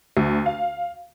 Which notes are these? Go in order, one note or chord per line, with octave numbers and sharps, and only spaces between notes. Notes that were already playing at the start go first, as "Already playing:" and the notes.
D2
F5